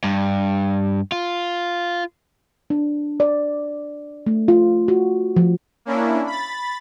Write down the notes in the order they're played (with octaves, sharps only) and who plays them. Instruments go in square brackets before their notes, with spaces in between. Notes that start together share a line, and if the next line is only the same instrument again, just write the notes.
[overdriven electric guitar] G2
F4
[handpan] D4
D5
A3
F4
F#4
F3
[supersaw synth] A#3 C#4 D4 E4
B5 A6